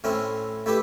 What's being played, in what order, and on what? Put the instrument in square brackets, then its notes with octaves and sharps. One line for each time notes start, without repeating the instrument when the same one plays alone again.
[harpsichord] A2 C4 C#4 E4
A3 E4 G4 B4